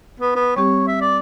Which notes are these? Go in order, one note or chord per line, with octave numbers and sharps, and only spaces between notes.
B3
B3
G3 C4 G4 C#5
E5
D5